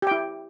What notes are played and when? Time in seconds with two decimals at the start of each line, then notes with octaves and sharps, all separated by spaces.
0.02 G4
0.07 G5
0.11 E4